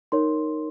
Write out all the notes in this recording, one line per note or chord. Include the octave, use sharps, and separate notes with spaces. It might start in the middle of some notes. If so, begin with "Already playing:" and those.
D#4 A#4 C#5 C6